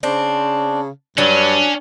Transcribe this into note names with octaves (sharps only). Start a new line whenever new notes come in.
C#3 C4 D4
G2 F#3 C#4 D4